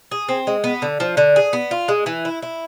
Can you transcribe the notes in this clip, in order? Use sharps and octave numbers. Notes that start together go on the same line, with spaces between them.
G#4
C4
G#3
B3
D3
F3
D3
G#4
B3
F4
G#3
E3
E4
E4